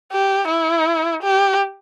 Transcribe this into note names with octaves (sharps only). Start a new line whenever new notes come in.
G4
E4
G4